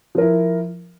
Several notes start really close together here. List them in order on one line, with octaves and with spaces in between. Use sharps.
F3 A#4 E4